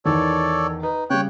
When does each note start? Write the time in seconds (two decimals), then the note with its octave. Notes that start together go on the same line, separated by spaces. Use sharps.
0.05 E2 D#3 A4 C#5 D5
0.83 D#4 B4
1.10 C#3 G3 C#5 G5 F#6